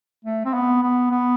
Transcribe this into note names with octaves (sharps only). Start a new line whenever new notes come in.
A3
C4
B3
B3
B3